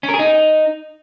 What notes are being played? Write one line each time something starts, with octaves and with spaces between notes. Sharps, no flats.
C#4
A#4
G#4
D#4